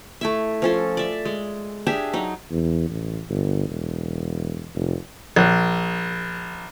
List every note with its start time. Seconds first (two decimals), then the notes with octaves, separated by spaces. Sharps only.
0.21 A3 E4 E5
0.62 F3 C#4 A4
0.97 D5 E5
1.25 G#3
1.87 D4 G4 G#4 E5
2.13 F#3 D#4
2.51 E2
2.90 A1
3.29 G1
3.69 E1
4.75 F1
5.36 A#1